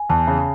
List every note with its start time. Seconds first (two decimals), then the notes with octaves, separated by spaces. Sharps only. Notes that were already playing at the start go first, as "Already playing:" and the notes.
Already playing: G#5
0.10 E2 A5
0.27 C#3